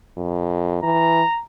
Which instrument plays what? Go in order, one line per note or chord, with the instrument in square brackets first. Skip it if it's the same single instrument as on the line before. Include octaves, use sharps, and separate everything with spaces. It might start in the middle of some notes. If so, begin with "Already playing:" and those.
[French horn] F2
[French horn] E3 [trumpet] A#5